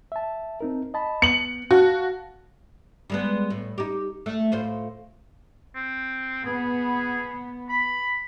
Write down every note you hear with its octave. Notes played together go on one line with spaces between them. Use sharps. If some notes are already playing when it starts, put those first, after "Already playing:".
E5 A5
C4 D#4 A#4
D#5 A5 B5
B3 C#7 F#7
F#4 F5 A5 F#6
G3 G#3 B3
A2
D#4 G4
A3
A2 F4 C5
C4
B3 G#4
B5